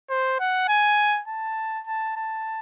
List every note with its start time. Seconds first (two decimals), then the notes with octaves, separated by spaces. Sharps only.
0.10 C5
0.40 F#5
0.68 G#5
1.28 A5
1.87 A5
2.16 A5